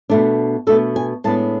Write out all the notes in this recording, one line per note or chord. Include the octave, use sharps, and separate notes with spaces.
B2 A3 D4
B2 A3 D4 A4
G#5
A2 G#3 B3 D4 A5